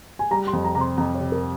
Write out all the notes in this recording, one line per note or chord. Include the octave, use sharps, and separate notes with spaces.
G#5
G3 A#5
C6
F2
A#5
C3 A#5
C6
F2 A#5
C#5
C3
A#4